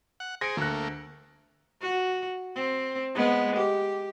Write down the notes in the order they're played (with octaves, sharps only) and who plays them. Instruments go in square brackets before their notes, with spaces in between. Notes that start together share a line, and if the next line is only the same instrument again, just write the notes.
[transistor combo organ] F#5
[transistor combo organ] G#4 C5 [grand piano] A#6 C#7 D7
[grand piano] D2 F#6 [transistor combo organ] A3 A#3
[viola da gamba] F#4
C4
G#3 B3
G4